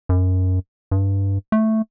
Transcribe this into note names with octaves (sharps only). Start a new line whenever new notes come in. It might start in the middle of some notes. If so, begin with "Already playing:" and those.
F#2
G2
A3